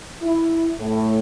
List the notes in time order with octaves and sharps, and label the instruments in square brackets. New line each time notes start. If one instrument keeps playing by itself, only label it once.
[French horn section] E4
A2